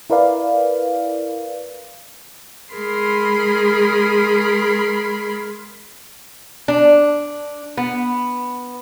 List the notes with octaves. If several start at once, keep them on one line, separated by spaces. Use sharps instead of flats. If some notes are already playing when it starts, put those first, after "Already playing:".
E4 A#4 B4 D5 F5
G#3 G#4 A#4 B5 C6
D4
B3